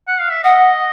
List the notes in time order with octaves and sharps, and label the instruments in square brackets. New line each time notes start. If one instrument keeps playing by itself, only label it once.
[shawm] F#5
F5
E5
[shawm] D#5 [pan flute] F#5